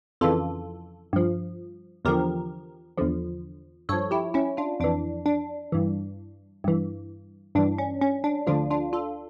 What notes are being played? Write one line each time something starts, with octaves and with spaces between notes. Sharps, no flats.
F2 C#3 E3 F4 A4
G2 F3
E2 D3 F3 G4 A#4
E2 D3 F3
G2 F3 A4 C#5
E4 G4
C#4 E4
D4 F4
F2 E3 D4
D4
G2 E3
G2 E3
G2 E3 D4
C#4
C#4
D4
D2 D3 F3 D4 F4
D4 F4
F4 A4